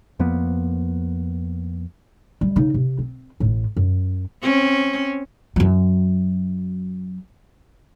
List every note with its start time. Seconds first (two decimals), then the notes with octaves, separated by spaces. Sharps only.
0.20 F2 F3 A#3 B3
2.41 G3
2.56 C#3 D#4
2.74 C3
2.99 C4
3.40 A1 A2
3.77 F#2
4.42 C4 C#4
5.56 F#2 F#3